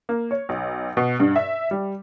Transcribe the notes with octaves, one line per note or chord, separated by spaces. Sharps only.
A#3
C#5
B1
B2
G2
E5
G3